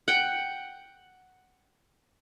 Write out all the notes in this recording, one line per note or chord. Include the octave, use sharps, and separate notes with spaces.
F#5 G5